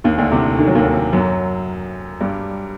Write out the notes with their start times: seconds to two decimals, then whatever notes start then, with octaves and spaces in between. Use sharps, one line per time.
0.04 D#2 D#3
0.18 D2 D3
0.32 C2 C3
0.59 D#3
0.67 F#3
0.75 D#2 D#3
1.13 F#2 F#3
2.21 G2 G3